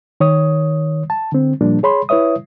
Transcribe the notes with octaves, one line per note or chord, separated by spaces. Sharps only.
D#3 C#5 D#6
A5
D3 C4
A#2 F3 G3 A#3 D4
G#4 C#5 B5 C6
E4 B4 C#5 E5 D#6